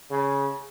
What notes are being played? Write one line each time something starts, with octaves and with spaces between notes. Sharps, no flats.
C#3